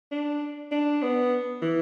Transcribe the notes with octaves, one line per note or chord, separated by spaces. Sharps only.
D4
D4
B3
E3